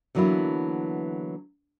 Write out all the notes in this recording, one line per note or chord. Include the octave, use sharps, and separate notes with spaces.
D3 E3 F#3 A#3 B3 E4